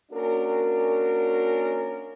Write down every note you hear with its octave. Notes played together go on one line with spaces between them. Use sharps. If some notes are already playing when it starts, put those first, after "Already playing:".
A#3 C#4 D4 F#4 A#4